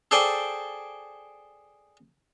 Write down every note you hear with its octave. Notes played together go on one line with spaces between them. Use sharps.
G#4 A4 C5 D5 G5 G#5